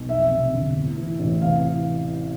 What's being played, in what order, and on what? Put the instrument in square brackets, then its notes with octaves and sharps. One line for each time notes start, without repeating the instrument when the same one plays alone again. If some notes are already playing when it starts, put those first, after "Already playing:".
Already playing: [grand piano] B1
F2 E5
C3
G1
A2
E3
A1
C3 F5
E3